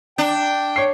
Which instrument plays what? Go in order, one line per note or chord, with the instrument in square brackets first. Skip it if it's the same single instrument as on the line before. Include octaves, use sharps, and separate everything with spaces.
[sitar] D4 [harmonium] G5
[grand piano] C#5 C7